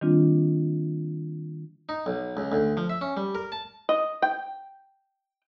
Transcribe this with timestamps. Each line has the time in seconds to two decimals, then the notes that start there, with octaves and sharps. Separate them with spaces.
0.01 D#3 G3 A#3 C4 D4 F4
1.89 D#4
2.06 B1
2.37 C#2
2.52 D2
2.77 F3
2.90 E5
3.01 C#4
3.17 G3
3.35 A#4
3.52 A5
3.89 D#5
4.22 G5